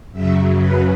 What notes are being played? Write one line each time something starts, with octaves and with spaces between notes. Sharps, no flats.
F#2 C#3 F#3 E5
B4